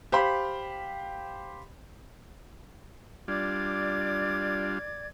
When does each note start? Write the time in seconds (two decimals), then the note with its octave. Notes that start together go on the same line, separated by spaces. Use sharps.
0.12 G4 C5 F5 B5
3.28 G3 D4 F4 D5 D6 G#6